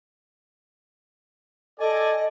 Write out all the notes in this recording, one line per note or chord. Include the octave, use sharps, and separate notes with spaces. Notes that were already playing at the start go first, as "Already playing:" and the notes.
A4 D5 D#5 G#5